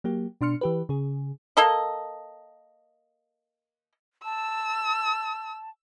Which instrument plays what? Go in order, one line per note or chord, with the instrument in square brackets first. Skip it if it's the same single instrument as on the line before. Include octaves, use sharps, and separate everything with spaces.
[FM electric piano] F#3 A#3 G4
B2 D4 C6 F6 C#7
E3 G4 B4
C#3 G#4
[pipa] A#3 A4 D#5
[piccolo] A5 [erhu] E6